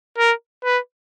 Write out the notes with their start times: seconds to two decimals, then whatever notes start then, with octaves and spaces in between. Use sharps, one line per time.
0.18 A#4
0.64 B4